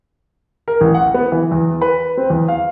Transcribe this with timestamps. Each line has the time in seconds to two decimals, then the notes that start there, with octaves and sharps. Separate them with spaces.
0.68 A#4
0.81 A1
0.94 F#5
1.14 B3
1.32 E3
1.52 E2
1.81 B4
2.17 C4
2.30 E2
2.48 F5